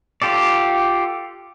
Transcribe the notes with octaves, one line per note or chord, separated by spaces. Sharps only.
F4 G4 A4 D5